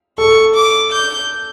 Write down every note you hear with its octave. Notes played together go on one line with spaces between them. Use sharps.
A4 C#6
D6
G6